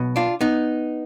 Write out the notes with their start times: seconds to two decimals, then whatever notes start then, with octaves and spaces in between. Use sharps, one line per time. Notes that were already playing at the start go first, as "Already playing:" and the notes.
Already playing: B1 B2
0.16 D4 F4
0.41 B3 D#4